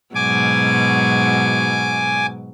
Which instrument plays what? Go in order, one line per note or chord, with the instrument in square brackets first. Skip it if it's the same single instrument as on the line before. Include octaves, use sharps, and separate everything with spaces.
[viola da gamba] G#2 B2 F#3 [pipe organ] G#5 D6